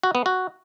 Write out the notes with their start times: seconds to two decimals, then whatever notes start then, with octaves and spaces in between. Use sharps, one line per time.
0.03 F#4
0.15 B3
0.26 F#4